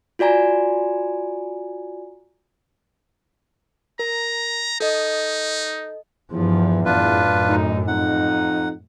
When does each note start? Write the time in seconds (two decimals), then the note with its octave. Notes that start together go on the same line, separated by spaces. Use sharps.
0.19 F4 F#4 D5 G#5 A#5
3.99 A#4 A#5
4.80 D#4 A4 D#5
6.31 E2 G2 F3
6.85 F#2 A2 D4 F4 B4
7.49 D2 D#4
7.87 F2 D#4 F#5